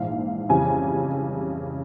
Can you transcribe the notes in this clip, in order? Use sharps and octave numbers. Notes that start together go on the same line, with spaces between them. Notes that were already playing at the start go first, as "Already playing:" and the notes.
Already playing: A#1 G#2 E3 F5
F2 C#3 E3 G3 G#5